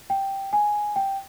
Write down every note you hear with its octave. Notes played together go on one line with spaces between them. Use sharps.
G5
G#5
G5